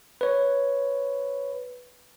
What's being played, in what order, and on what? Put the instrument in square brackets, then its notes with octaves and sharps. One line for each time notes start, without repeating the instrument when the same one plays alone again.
[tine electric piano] B4 C#5